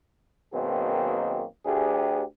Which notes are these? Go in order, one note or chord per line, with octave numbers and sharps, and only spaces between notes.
F#2 B2 D#3 A#3 C4 G#4
D2 G4 G#4